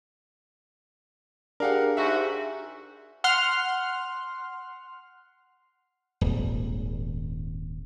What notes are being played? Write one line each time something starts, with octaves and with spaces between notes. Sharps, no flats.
D4 G4 G#4 A#4 F5 F#5
G#2 F#4 E5
F#5 C6 F6
D#1 G#1